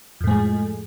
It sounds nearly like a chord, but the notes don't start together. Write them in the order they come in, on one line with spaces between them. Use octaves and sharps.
F2 A2 G#3